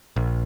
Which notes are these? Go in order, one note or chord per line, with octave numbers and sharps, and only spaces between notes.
A#1